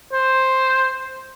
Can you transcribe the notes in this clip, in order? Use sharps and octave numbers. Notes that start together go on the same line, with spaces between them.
C5